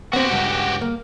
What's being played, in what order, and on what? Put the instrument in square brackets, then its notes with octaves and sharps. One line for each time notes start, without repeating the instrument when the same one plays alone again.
[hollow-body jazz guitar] B3 C4 [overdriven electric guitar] F#4 G4
[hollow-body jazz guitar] C#2 G2
A#3